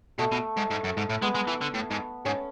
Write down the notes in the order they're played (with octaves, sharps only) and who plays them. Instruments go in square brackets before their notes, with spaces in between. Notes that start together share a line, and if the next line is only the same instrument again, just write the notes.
[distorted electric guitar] B2 [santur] A3
[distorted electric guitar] B2
G#2
G#2
F#2
G#2
A2
[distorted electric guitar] G#3 [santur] B3
[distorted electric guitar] G#3
E3
D3
A2
G#2
[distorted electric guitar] G#2 [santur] C#4